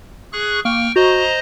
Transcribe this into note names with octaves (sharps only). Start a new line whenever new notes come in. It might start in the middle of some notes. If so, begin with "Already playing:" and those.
G#4 C#6 F#6
A#3 G5 C#6 F6
F#4 C5 D#5 A#5